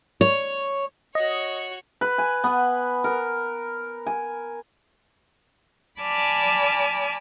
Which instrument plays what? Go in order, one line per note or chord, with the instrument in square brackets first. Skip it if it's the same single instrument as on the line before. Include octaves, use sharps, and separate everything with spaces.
[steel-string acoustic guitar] C#5
[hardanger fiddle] F#4 C#5 [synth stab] D#5
[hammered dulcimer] B4
G#5
B3
A#4
G#5
[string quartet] D5 G#5 A5 B5 D6 F6